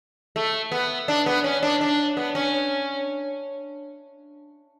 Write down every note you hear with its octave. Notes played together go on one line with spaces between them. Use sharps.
A3
B3
D4
B3
C#4
D4
D4
B3
C#4